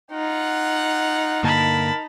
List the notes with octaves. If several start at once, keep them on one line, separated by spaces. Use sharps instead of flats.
D#4 F4 F#5
G2 D3 A#3 A#4 A5 B5